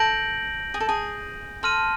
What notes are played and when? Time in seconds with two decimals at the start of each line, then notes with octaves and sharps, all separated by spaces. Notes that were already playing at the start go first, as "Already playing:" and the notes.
Already playing: A4 G6 A#6 D7 F#7
0.74 G#4
0.80 A4
0.89 G#4
1.63 A4 A5 C6 F6 A#6 D#7